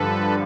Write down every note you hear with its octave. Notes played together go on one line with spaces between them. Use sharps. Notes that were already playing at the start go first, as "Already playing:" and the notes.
Already playing: G2 D3 F3 A4 B4